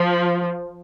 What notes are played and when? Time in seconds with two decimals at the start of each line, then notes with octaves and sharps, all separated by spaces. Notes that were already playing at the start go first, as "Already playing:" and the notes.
Already playing: F3